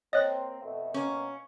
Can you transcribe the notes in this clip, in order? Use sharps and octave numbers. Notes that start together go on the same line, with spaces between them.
A#3 C4 C#5 D#5 F#6 A#6
F2 B2 A3
B2 A#3 C#4